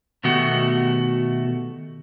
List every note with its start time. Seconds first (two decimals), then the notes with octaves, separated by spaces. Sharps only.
0.24 B2 D#3 A3 B3 F#4 G4